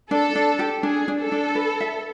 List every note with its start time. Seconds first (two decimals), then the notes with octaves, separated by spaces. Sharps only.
0.11 D4 A4
0.35 D4
0.59 G4
0.83 D4 G#4
1.08 D4
1.20 A4
1.32 D4
1.55 B4
1.80 E5